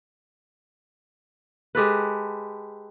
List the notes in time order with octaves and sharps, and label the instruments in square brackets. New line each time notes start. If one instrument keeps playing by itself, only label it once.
[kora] G#3 G4 A4 B4